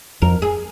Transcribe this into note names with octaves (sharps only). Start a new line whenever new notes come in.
F2 A#4
G#4